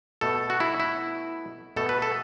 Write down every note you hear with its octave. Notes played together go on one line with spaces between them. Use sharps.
B2 A3 A4
F#4
E4
E4
B2 A3 A4
B4
A4